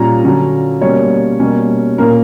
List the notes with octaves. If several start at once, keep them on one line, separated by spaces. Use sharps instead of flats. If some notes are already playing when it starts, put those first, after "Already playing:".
Already playing: A#2 G3 C#4 A#5
D3 F#3 C#4
B2 G3 A#3 C#4 C#5
B2 G3 A#3 C#4
A#2 A#3 C#4 A#4